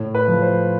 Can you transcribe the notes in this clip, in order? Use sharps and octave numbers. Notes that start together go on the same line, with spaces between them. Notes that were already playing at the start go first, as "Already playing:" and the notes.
Already playing: A2
B4
F3
C5